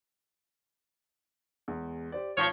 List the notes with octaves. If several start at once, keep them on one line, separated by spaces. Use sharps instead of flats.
E2 G#3
G4 C5 D5
G#1 F3 C#5 A5